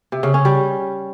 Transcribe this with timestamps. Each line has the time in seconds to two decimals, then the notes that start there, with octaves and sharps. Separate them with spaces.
0.12 C3
0.23 C#3
0.34 C#4
0.45 G3